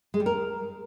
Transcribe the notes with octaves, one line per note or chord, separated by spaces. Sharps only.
G#3
G3
A#4